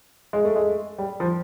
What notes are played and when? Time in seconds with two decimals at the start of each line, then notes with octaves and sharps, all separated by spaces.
0.33 G#3
0.45 A3
0.56 G#3
0.98 G3
1.20 F3